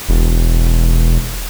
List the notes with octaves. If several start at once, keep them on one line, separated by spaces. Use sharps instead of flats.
E1